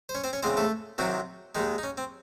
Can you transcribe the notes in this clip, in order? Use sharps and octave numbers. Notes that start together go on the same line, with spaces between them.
C5
C#4 C#5
C4 C5
C#4 C#5
E2 C#3 G#3 C4 C5
A3 A4
C2 C3 D#3 F#3 C4 F#4
D#2 D#3 G#3 D#4
D#4
C#4
C4